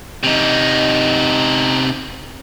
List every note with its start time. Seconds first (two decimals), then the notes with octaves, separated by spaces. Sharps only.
0.23 C3 D#4